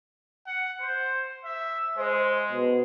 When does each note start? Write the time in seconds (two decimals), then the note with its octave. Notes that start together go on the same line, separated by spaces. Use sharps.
0.47 F#5
0.81 C5
1.44 E5
1.97 G#3 C5
2.52 B2